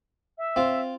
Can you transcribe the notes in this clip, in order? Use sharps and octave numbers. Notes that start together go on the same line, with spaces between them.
E5
C4 F4